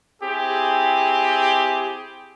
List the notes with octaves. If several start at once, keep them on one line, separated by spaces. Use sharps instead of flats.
C4 E4 G4 G#4